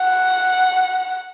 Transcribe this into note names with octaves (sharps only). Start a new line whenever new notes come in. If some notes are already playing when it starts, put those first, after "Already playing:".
Already playing: F#5